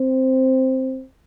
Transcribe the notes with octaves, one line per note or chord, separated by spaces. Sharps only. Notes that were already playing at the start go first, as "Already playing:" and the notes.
Already playing: C4